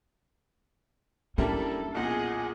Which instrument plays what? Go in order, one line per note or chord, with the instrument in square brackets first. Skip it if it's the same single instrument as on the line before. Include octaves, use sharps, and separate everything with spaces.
[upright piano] G3 A#3 E4 [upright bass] C#4 D4 [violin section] A4
[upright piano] B1 E2 A#2 [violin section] G#4 D#5 F#5